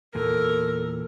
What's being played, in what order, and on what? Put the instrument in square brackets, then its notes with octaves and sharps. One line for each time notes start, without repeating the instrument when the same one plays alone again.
[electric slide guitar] E2 A#2 [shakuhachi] A4 [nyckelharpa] A#4